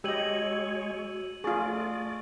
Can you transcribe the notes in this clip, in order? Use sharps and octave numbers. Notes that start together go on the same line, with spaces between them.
G#3 F#4 G4 C#5 D#5 E6 D#7 F#7
A3 F4 G#4 D5 C#6